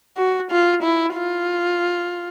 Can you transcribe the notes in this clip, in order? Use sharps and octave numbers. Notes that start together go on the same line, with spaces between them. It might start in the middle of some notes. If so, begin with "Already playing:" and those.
F#4
F4
E4
F4